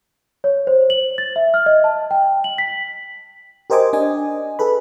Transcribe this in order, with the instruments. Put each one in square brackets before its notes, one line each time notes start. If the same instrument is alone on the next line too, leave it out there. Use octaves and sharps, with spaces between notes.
[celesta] C#5
C5
F#7
A6
E5
F6
D#5
A5
G5
F#7
B6
[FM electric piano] G4 A#4 C5 D#5 G#5 D6
D4 D#5 G#5
G#4 A4 B4 B5